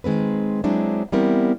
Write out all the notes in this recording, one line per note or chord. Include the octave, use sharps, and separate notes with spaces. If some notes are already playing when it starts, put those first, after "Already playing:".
D#3 G#3 C4 B4
F#3 G#3 C4 D4 E4
E3 G3 B3 C4 E4 A#4